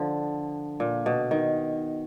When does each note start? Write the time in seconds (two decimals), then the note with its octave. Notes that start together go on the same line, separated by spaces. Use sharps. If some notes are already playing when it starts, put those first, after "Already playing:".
Already playing: D3 F3
0.80 A#2
1.06 B2
1.31 D#3